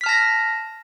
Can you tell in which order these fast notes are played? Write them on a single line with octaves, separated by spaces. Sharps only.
B6 F6 A5 A#6